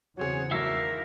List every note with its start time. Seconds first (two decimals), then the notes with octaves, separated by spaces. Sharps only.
0.17 E2 C#3 F#3 C4 G#4 C#5 F#5
0.51 G#1 F#3 A3 E4 A#4 E5 F5 E6